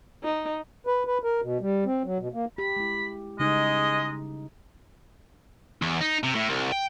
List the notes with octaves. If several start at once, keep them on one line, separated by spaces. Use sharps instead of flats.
D#4
B4
B4
A#4
B2
G3
C4
F#3
B2
A#3
G4 B5
G#3 E4
C#3 G3 G#3 D#4 D#5
E2
D#4
C3
A2
C2
G5